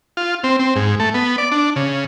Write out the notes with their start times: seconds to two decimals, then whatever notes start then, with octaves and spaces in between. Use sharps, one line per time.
0.17 F4
0.44 C4
0.59 C4
0.76 G#2
1.00 A3
1.14 B3
1.38 D5
1.52 D4
1.76 C#3